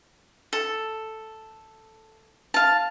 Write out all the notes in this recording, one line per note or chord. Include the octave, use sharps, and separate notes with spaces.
A4
F5 A5